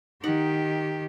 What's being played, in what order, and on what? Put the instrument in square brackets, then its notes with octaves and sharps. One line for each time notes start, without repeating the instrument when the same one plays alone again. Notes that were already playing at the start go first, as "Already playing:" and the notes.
[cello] D#3 G4 [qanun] D#4 F#5